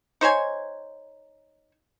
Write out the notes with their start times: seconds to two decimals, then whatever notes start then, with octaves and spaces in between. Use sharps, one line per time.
0.21 D#4 C5 C#5 G#5